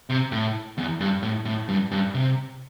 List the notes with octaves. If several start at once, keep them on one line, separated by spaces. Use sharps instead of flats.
C3
A2
E2
G2
A2
A2
G2
G2
C3